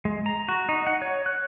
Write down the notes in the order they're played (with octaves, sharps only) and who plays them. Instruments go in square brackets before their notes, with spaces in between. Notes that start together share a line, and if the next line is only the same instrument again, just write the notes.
[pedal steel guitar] G#3
A#5
F#4
D#4
F#5
C#5
F#6